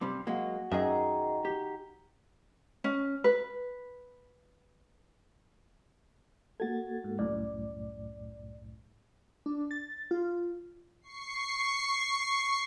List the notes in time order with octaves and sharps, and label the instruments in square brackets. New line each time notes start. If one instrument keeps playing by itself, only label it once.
[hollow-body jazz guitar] G2 C3 G3
[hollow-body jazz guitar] F#3 G#3 A#3 [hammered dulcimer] F#4 G#4
[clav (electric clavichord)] F#2 [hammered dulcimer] D#3 D6 [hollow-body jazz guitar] G#4 D#5 E5
[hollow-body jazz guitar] G4
[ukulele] C#4
B4
[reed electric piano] A#3 F#4 A4 [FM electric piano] G#6 A6
[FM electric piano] G#2
[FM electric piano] C2 F#2 A2 [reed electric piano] D5
[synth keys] D4
A6
F4
[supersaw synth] C#6 C7